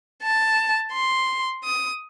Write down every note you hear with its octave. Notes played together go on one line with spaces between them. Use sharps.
A5
C6
D#6